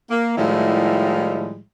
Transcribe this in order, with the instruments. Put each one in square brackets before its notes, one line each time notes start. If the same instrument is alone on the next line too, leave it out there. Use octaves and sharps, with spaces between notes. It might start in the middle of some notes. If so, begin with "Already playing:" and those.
[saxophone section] A#3
A2 D#3 F3 G3 G#3 E4